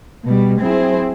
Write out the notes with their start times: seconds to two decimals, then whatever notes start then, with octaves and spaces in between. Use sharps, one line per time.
0.24 B2 G3
0.60 F#3 C4 E4 G#4 C5